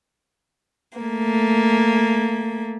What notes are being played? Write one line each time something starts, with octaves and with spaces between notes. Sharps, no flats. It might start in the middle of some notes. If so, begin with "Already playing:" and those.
A3 A#3